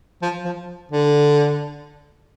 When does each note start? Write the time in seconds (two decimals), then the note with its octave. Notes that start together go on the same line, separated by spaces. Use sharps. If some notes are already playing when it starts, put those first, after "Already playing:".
0.22 F3
0.45 F3
0.92 D3